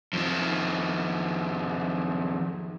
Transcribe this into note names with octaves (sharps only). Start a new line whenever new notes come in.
F2 D#3